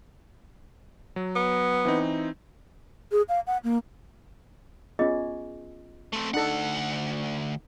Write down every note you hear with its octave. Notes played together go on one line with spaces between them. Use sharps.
F#3
B3
E3 C4 D#4
G#4
F5
F#5
A#3
B3 C#4 F4 G#4 D#5
A3 C4
D2 D4 D#4 A4 F#5